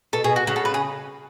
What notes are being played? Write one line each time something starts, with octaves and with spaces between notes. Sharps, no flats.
B2 A4
B2 G#4
F#4
C#3 F#4
A4
B4
G#4